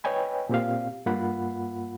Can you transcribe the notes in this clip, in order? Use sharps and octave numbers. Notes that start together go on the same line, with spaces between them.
B4 C#5 D#5 G5 G#5 B5
A#2 C4 G4 F5
G2 A#3 F4 F#5 B5